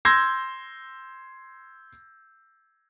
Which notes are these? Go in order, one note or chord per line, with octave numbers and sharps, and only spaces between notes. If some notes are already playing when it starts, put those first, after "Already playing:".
C6 E6 G6 G#6 A#6